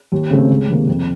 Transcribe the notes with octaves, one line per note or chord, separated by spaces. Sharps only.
D#2
C#3 A3 C4
C#2
C3 D#3 A#3
F2